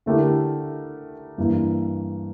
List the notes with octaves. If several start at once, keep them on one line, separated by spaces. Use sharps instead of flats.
D3 A3 E4 G4 A#4
G2 E3 A#3